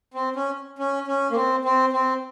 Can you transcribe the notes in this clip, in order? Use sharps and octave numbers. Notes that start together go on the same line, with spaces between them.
C4
C#4
C#4
C#4
A#3
C4
C4
C4